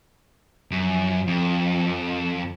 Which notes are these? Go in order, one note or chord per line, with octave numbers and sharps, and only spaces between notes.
F#2 F3
F2